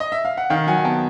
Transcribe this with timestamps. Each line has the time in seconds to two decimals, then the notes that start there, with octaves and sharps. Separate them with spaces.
0.00 D#5
0.12 E5
0.25 F5
0.37 F#5
0.50 D#3 F5 G5
0.67 F#3 F#5 G#5
0.77 G#5
0.84 B3 G5 A5